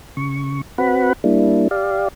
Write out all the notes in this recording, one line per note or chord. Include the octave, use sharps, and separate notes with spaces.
C#3 C#6
C4 F#4 B4 F#5 B5
G3 A#3 D4 E4
G4 D5 F5